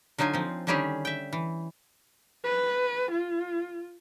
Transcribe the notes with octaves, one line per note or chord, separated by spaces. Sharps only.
D3 F#3 D#4 F4 G#5
F3 C4
D3 D#3 G3 C#4 G4 G#4
E5 G5
E3
B4
F4